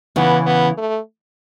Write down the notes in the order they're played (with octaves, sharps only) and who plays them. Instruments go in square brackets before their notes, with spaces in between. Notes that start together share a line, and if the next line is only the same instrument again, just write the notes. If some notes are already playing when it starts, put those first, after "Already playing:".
[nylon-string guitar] C#3 E3 [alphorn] B3
[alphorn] B3
A3